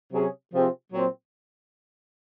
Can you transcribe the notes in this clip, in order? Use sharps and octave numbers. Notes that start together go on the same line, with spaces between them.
C3 F#3 C#4 G#4
C3 F3 C4 F4 G#4
A#2 F#3 C4